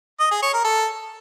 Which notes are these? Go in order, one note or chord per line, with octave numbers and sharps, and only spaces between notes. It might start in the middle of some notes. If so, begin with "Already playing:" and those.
D#5
G#4
C#5
A#4
A4